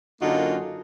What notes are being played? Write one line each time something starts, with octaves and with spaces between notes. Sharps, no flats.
F#2 D3 A#3 D#4 F4 F#4